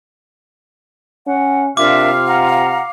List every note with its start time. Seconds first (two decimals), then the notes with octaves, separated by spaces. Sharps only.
1.27 C#4 F#5
1.77 C3 D4 F4 A#4 E5 F5 D6
2.27 F#5 A#5